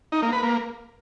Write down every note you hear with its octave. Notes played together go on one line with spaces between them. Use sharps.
D#4
A#3
B4
A#3